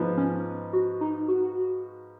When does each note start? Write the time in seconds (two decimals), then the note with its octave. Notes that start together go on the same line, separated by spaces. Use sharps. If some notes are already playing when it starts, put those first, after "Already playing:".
Already playing: G#2 F3 B3
0.17 C#4
0.73 F#4
1.01 D#4
1.28 F#4